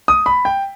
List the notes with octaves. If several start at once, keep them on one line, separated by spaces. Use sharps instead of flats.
D#6
B5
G5